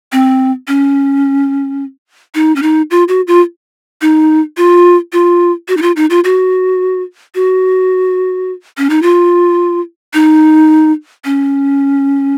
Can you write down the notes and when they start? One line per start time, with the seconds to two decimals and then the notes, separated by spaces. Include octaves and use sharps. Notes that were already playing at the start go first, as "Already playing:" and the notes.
0.12 C4
0.68 C#4
2.35 D#4
2.56 C#4
2.62 D#4
2.91 F4
3.08 F#4
3.27 F4
4.02 D#4
4.57 F4
5.13 F4
5.68 F#4
5.77 D#4
5.82 F4
5.96 D#4
6.10 F4
6.24 F#4
7.35 F#4
8.78 C#4
8.90 D#4
9.02 F4
10.14 D#4
11.25 C#4